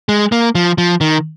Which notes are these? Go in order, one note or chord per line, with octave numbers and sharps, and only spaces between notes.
G#3
A#3
F3
F3
D#3